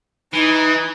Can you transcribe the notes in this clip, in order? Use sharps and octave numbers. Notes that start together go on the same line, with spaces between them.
E3 D#4